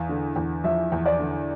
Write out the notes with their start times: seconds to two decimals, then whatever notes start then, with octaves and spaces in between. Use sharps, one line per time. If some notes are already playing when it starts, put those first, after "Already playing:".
Already playing: E2 F5
0.09 D3
0.36 E2
0.64 F3 E5
0.92 E2
1.06 D5
1.19 D3